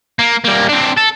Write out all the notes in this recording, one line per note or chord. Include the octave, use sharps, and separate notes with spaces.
A#3
G3 A#3
C4 D4
A4